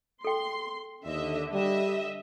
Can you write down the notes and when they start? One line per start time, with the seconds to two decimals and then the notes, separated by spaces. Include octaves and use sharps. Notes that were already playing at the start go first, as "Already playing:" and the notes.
0.24 A4 G5 C6
1.05 D#2 D3 D#5 E5
1.53 G3 D#5 E5